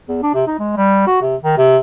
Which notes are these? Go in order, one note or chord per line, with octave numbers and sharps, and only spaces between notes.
E2
D4
C3
D#4
G#3
G3
F#4
C3
D#3
C3